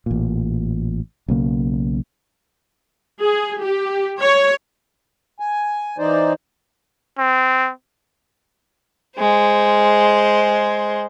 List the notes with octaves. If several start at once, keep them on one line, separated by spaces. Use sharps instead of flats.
A1 A#2
B1 C#3 A#3
G#4
G4
C#5
G#5
E3 D#4 C5 D5
C4
G#3 C5